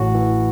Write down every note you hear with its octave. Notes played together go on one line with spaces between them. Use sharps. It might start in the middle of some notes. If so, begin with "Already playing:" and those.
Already playing: A1 A2 F#4
E3